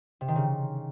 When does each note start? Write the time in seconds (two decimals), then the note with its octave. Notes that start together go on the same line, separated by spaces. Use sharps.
0.21 C3
0.28 D#3
0.36 C#3